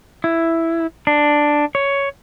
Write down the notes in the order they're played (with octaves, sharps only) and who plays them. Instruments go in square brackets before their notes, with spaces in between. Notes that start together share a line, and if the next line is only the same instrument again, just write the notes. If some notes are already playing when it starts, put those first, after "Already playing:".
[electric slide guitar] E4
D4
C#5